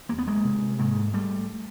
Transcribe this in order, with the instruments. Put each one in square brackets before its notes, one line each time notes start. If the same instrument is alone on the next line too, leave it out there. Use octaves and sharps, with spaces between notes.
[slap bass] E2 A#3
B3
G#3 A#3
C3
G#2 G#3 A#3
G3 A3